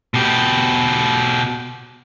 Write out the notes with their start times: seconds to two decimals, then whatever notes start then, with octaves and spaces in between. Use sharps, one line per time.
0.14 B2 G4